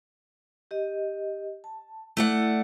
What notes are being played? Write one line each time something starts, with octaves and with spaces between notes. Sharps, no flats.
G4 D#5
A5
A3 E4 D5 F#5 E6